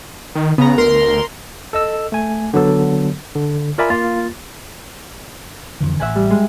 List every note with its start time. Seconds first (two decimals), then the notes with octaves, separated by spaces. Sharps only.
0.35 D#3
0.58 C#3 B3 A#5
0.78 D2 A#4 A#5 C6
1.73 A4 D#5 E6
2.12 A3 G#5
2.53 D3 F#3 B3 A4
3.35 D3
3.78 F4 A#4 D5 E5 G#5 B5
3.90 A#3 F4 A6
5.80 F2 D3 E3
6.00 A1 E5 F#5 G#5
6.15 G3
6.30 G#3